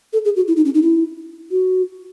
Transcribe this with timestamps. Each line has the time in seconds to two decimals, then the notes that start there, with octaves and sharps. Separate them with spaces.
0.13 A4
0.25 G#4
0.36 F#4
0.48 E4
0.56 D#4
0.65 C#4
0.74 D#4
0.82 E4
1.51 F#4